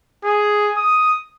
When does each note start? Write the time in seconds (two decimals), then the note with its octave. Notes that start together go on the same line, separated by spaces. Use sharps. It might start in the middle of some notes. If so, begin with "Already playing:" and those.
0.24 G#4
0.77 D#6